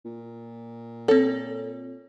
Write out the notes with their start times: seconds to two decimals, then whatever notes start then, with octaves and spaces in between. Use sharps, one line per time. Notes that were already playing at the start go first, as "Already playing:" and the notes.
0.05 A#2
1.08 C4 A4 C#5